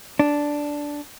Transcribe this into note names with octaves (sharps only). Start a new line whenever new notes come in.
D4